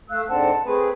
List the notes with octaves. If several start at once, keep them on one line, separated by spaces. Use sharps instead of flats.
A3 F5 E6 F#6
G#2 D3 C4 F#5 A5
A3 C4 G#4 B4